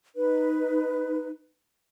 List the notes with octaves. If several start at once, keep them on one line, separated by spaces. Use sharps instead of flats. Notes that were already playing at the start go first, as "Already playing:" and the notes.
D#4 B4